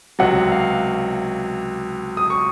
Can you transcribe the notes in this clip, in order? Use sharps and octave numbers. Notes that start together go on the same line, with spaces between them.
C#2 C3 F#3 F#5
F5
D#6
C#6